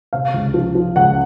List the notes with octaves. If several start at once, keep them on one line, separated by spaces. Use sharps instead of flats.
C3 F5
C#2
F3
F3
C#2 F#5